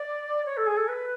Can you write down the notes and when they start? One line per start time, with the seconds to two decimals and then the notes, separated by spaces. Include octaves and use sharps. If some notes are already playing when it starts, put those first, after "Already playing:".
Already playing: D5
0.45 C#5
0.57 A4
0.66 G#4
0.77 A4
0.88 B4